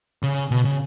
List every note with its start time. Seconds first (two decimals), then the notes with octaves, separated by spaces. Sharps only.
0.23 C#3
0.51 B2
0.65 C#3